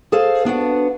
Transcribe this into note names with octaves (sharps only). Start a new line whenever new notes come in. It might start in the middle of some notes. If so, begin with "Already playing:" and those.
G#4 A4 C5 F5
B3 D4 F#4 F#5